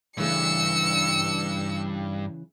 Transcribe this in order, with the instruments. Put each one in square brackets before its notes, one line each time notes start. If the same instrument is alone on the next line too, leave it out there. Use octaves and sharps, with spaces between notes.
[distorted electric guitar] G2 [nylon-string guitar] C#3 E3 A3 [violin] E6 C#7